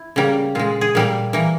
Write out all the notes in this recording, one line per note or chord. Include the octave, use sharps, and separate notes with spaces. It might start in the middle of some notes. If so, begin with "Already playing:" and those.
Already playing: E4
C#3 G3 A#3
A#2 G#3 F4
G#4
A#2 G3 A#3
E3 A#3